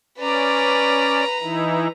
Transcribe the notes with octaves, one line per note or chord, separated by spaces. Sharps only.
C#4 B4 D5 A#5
E3 D#4 E4